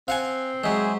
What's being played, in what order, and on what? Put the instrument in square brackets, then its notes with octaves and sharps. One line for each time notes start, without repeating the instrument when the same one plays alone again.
[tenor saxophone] C4 [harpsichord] F5 F#5 G#5
[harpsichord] F#3 G#3 [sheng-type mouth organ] G#4 C5 E5